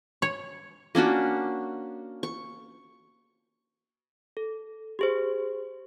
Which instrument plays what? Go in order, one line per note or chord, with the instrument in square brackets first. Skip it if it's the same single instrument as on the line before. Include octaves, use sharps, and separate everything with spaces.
[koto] C#5
[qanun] A#3 C#4 D4 F#4
C#6
[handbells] A4
G4 G#4 C5